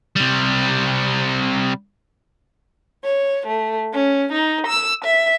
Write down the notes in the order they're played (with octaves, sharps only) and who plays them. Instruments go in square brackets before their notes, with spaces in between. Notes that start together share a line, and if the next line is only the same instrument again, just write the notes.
[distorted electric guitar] C3 G3
[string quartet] C#5
A3
C#4
D#4
E6
E5